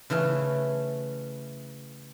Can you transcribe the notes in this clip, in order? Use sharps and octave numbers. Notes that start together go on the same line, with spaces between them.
C#3 E3 A3 C#4